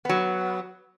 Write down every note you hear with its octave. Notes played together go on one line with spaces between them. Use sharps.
F#3 B3